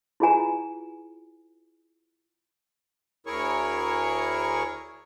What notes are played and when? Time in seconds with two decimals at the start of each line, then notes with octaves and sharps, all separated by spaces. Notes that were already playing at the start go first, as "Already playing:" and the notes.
0.20 E4 F4 G#4 B4 G#5 A#5
3.27 D2 E4 G#4 A#4 C#5 C#6